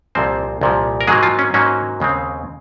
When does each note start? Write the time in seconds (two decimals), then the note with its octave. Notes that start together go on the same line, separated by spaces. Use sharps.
0.15 C2 A#2 F3 C4 C5
0.61 C2 A#2 F3
1.01 A#4
1.07 G#2 F#3 G#3 A#3 G#4
1.23 F3 F4
1.39 C#4
1.54 G#2 F#3 A#3 C#4
2.00 D#2 C#3 G#3 C4